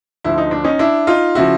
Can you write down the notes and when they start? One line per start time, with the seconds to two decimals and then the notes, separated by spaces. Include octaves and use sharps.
0.24 D2 D3 F3 E4
0.38 D#4
0.51 D4
0.64 C#4 D#4
0.79 D4 E4
1.07 D#4 F4
1.35 C#3 F3 E4 F#4